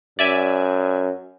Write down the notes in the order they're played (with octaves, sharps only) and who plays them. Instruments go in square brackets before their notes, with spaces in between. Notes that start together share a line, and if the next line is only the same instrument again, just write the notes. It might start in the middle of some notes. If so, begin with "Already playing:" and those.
[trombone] F#2 [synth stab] D5 E5 G#5